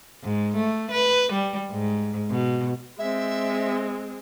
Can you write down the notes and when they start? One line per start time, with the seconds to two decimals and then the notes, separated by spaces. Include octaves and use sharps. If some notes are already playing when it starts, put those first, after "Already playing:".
0.23 G#2
0.56 A3
0.91 B4
1.33 G3
1.71 G#2
2.30 B2
2.98 G#3 C4 E5